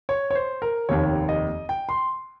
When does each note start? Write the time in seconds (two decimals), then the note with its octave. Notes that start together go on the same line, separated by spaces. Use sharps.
0.09 C#5
0.31 C#5
0.35 C5
0.62 A#4
0.89 F1 D#2 D#3 C#5
1.29 D#5
1.69 G5
1.89 C6